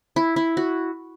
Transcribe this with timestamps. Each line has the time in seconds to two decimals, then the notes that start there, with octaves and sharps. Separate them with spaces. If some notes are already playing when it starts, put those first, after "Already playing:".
0.16 E4
0.36 E4
0.57 F#4